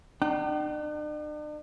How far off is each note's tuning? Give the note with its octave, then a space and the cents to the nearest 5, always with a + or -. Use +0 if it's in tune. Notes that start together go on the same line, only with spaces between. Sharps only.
D4 +45 G5 -40